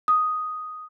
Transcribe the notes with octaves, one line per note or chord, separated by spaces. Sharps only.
D#6